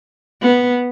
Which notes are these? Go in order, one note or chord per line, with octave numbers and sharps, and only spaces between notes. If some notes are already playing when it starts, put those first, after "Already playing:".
B3